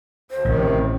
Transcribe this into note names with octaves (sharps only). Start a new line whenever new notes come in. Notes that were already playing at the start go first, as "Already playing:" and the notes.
D2 C5
A1 A2 C3 D#3